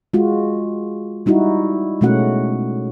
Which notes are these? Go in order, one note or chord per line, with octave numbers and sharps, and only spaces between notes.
G#3 F4 F#4
G3 D#4 E4 F#4
B2 G#3 A3 C#4 F#4 F#5